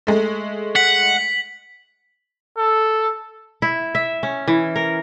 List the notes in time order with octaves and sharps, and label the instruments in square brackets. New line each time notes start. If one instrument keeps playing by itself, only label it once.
[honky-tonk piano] G#3 A3
[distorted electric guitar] F#5 [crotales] B6 F#7
[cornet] A4
[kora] E4
E5
C#4
E3
A#4